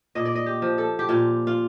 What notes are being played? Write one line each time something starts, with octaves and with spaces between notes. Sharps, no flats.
A#2 D#5
D5
D#5
G4
F3
A4
G4
A#2 F4
F4